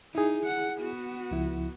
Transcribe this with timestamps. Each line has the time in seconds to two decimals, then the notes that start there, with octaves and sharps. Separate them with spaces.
0.15 D#4 E4 G#4
0.46 F#5
0.79 B3 F#4
1.31 C#2 F3 E4